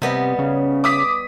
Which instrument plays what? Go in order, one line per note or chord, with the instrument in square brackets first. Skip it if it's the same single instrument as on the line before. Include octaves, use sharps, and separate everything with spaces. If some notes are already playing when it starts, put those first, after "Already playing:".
[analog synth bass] C3 [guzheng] G3 B3 D#5
[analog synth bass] C#3
[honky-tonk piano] D6 D#6 B6